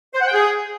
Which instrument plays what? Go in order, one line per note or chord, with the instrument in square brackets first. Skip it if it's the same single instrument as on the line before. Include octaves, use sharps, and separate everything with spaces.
[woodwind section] C5
F#5
G5
G#4